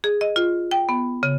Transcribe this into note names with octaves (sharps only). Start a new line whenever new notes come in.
G#4
D#5
F4
G5
B3
C#3